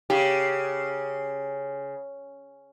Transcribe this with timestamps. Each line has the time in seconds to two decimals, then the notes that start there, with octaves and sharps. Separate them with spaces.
0.10 C#3 G4